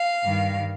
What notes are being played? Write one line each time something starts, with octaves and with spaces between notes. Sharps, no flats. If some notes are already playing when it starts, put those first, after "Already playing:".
Already playing: F5
G2 D#3 G3